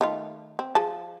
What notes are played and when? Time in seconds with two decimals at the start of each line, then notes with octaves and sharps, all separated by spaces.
0.01 D#3 A3 F4
0.59 C4
0.75 F3 G#4 A5